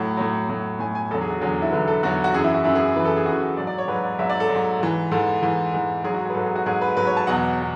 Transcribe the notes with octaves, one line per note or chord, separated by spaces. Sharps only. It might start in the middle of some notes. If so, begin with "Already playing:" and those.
Already playing: A2 F#3 F#5
A2 F#3
A2 F#3
A2 F#3 G#5
G#5
E2 D3 F#3 A4
G#4
F#4
E2 D3 F#3 G#4
E4
E2 D3 F#3 B4
A4
E2 D3 F#3 F#4
F#4
F#2 E3 G#4
E4
F#4
F#2 E3 E4
G#4
F#2 E3 B4
A4
G#4
F#2 E3 F#4
F#4
G#2 F#3 D5
D5
C#5
G#2 F#3 B4
D5
G#2 F#3 E5
D5
A4
F#3
G#2
G#2 E3
G#2 E3 A4
G#2 E3
G#2 E3
G#2 F#3 G#4
F#4
G#4
B4
G#2 F#3 A4
G#4
F#4
G#2 F#3 G#4
B4
G#2 F#3 B4
C#5
A5
E2 B2 F#3 F#5
B2